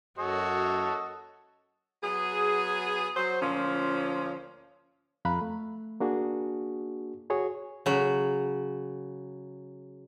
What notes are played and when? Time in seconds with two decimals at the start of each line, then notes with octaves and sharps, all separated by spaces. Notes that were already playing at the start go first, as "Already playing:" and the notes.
0.18 F#2 F#4 A4 C#5 D#5
2.03 F#3 B3 G#4
3.16 F#3 C5
3.42 D2 A#2 F3 C#4
5.25 F2 F5 A#5 B5 F#6
5.42 A3
6.00 A#3 D4 F#4 G#4
7.30 F#4 G#4 C#5
7.86 C#3 F#3